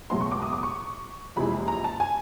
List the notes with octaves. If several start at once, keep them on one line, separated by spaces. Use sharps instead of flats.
C#2 B2 F#3 A3 C6
C#6
D6
D#6
D6
C#6
F#1 F2 C3 E3 G#3 B5
A#5
A5
G#5